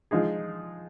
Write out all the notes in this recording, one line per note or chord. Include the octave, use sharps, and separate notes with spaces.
F3 G#3 D#4 G#4